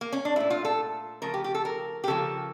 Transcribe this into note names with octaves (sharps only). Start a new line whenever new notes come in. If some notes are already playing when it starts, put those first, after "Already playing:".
A#3
C#4
D4
A#2 A3 E4
F4
A4
C#3 F3 A3 A#4
G4
G4
A4
A#4
G4
C#3 F3 A#3 A4